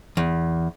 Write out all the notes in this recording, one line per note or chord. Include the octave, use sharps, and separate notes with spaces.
E2